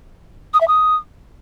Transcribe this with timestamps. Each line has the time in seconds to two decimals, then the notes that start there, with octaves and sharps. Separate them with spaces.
0.54 D#6
0.61 E5
0.68 D#6